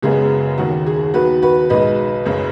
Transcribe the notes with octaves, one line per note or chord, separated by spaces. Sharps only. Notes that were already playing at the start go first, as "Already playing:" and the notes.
F#1 F#2 C#3 G#3 B3 G#4
D#2 D#3 F#3 F#4
G#4
D#2 D#3 F#3 B3 F#4 B4
F#4 B4
B1 B2 G#3 B4 D#5
F#1 F#2 C#3